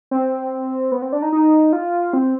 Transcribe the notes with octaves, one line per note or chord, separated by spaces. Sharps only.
C4
B3
C4
D4
D#4
D#4
F4
C4